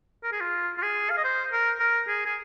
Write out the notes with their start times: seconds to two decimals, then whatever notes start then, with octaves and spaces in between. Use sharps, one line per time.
0.24 A#4
0.33 G#4
0.40 F4
0.78 F4
0.83 G#4
1.10 F5
1.17 D#5
1.24 C5
1.52 A#4
1.80 A#4
2.08 G#4
2.26 G#4